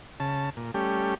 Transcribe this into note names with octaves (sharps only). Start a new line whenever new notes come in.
C#3 A5
A#2
G3 A3 C#4 G4